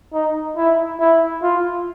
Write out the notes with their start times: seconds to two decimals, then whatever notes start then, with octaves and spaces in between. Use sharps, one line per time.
0.13 D#4
0.57 E4
1.00 E4
1.42 F4